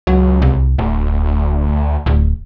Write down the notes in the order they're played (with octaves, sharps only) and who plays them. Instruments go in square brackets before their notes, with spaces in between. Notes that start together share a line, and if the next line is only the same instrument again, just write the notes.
[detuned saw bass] C#2 [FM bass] F#3
[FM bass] C2
[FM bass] D1 [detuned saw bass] D2
[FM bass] D1